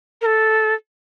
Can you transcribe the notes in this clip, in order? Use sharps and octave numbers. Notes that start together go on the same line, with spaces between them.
A#4
A4